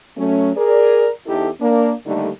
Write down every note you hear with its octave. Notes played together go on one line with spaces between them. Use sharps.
F#3 A3 C#4
G#4 A#4 D5
E2 D#4 E4 G4 A4
A#3 D4
D#2 D3 G3 A3 D#4 A4